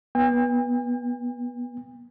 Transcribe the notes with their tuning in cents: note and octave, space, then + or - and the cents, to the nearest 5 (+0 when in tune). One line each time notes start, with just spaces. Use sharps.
B3 -20 G5 +45